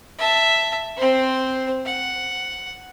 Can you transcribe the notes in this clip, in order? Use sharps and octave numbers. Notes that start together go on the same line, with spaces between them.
E5 A5
C4 C5
F#5